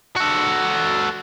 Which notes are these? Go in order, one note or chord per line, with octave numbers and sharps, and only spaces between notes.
F#4 A4